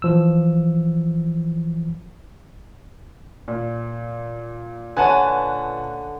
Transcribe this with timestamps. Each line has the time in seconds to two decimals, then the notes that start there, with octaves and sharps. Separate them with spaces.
0.02 E3 F3 E6
3.48 A#2
4.97 D3 B4 C#5 F#5 G#5 A5 D#7